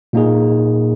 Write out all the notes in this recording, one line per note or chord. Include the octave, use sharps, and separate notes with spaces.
A#2 A#3 D#4 G#4